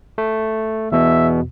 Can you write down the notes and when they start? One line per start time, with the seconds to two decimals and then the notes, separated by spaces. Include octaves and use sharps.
0.18 A3
0.92 E2 B2 E5